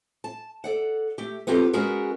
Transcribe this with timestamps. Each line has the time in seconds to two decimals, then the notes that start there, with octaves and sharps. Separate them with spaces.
0.24 A5
0.64 A4 D5 F#5
1.18 A3 G4
1.47 B3 C4 F4 G4 A4
1.73 G#3 B3 C#4 F#4 G#4 A#4